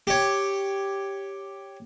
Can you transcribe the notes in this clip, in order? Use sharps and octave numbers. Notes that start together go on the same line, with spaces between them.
G4 C#5